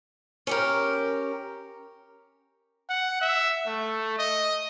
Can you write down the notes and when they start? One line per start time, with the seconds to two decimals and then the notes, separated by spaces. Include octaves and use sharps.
0.47 C#4 G4 A#4
2.90 F#5
3.21 E5
3.67 A3
4.19 D#5